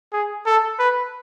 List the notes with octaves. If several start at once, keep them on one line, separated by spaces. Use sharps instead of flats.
G#4
A4
B4